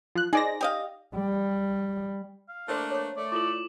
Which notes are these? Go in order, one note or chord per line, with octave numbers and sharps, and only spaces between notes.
F3 F#6
D#4 G#4 C5 D5 A#6
G4 D#5 F5
G3
F5
A3 A#3 D4 A#4 C5 C6
C#5 C#6
A3 D5
E4 F4 A4 D6 F#7